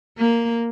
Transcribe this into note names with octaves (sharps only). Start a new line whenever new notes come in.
A#3